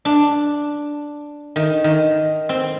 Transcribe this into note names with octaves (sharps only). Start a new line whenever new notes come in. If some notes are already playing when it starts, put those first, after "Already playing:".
D4
D#3
D#3
C4